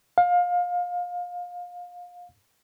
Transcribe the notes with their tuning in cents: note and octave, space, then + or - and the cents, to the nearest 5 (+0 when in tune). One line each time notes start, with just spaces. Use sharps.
F5 +25